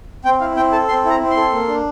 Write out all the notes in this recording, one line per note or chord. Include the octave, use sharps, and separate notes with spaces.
C4 G5
E4 F5
C4 G5
A4 A5
C4 C6
E4
A#5
C4
C6
A4
A#3
D4